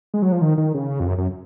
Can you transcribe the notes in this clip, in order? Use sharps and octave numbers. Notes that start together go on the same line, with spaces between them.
G#3
F#3
F3
D#3
D#3
C#3
F2
F#2
F#2